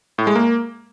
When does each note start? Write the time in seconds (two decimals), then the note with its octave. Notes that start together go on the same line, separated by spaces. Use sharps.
0.18 A2
0.27 G#3
0.35 A#3